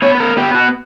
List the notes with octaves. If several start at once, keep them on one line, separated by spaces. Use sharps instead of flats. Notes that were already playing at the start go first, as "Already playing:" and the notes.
B3 C#5
B4
A#4
B3 G4
F#4